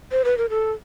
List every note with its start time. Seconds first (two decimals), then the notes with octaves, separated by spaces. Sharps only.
0.12 C5
0.25 B4
0.38 A#4
0.50 A4